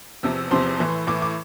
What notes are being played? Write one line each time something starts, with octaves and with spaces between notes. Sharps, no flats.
E2 C3 F3 E6
E2 C3 F3 C6
A2 E3
A2 E3 D6
D6